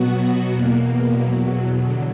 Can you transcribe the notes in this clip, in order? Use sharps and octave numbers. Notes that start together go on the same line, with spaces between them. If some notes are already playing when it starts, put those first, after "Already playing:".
Already playing: B2 F#3 B3 F#4
E2 B2 A#3
E2 B2 F#3
E2 D3 F#3